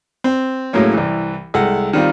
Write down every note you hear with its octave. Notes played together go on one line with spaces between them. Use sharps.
C4
A2 F#3 G#3 A#3 C#4
C2 E3
C2 G#3 A4 F#5
D#3 G3 C4 F4